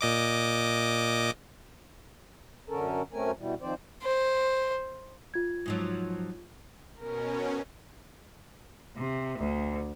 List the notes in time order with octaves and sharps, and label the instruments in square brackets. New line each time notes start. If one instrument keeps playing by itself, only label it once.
[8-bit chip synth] A#2 D#5 D6
[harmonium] F#2 D3 C#4 A4 A#4
F#2 A3 C4 C#4 A#4 G#5
B2 E3 G3
D#3 F3 C4 C5 D5
[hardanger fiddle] C5
[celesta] F4 G#6
[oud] G#2 F3 F#3
[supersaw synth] B2 C#4 [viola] A#4
[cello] C3
D2